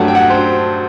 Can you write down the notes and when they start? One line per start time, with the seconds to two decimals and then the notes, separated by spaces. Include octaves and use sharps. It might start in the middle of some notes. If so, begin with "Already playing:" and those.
Already playing: G2 F#3 A3 F#5
0.08 G5
0.15 F#5
0.30 C5